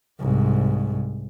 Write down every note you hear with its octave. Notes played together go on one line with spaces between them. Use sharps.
C2 G#2